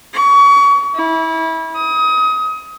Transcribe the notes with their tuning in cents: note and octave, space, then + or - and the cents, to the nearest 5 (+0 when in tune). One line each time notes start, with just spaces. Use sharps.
C#6 +30
E4 -25
D#6 +25